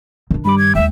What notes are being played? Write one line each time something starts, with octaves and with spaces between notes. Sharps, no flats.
D#3 D4
G2 G3 B5 D6
G#6
D#2 G#3 E5 G5